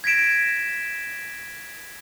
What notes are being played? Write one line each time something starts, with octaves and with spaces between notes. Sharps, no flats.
G#6 A#6 B6 D7 E7